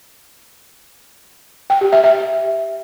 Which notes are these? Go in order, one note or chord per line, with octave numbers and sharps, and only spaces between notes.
G5
G4
E5
E5